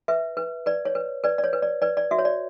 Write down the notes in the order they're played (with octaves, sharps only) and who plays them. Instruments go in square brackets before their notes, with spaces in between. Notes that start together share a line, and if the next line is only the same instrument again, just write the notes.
[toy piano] B4 E5
B4
B4 D5
C#5
B4
B4 D5
D5
C#5
B4
D5
B4 D5
D5
F#4 E5
C#5
D5